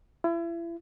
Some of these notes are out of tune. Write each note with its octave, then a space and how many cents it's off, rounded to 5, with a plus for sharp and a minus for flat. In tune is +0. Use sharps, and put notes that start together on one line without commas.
E4 +35